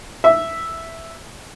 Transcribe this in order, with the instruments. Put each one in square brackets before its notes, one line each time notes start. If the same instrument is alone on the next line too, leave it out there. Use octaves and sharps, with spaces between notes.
[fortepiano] E5